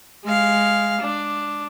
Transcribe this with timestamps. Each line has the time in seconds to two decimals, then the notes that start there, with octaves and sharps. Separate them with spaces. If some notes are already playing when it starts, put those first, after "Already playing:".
0.24 G#3 F5
1.01 D4